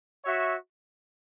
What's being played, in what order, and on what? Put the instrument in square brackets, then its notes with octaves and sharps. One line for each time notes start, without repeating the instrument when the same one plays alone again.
[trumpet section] F#4 C#5 E5